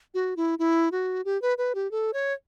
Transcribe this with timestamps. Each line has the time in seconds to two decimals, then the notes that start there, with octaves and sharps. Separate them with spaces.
0.14 F#4
0.37 E4
0.59 E4
0.92 F#4
1.25 G4
1.42 B4
1.58 B4
1.75 G4
1.91 A4
2.13 C#5